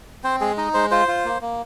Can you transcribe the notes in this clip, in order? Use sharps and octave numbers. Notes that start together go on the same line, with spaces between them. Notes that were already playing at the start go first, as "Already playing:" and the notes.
C4 C5
G#3 G#4
D#4 D#5
G#3 C5
F4 C5
F4
A#3
A#3